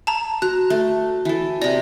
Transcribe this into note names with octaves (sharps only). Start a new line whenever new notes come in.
A5 A#5
F#4 A#5 F#6
A3
E3 A4
C3 D5 A#5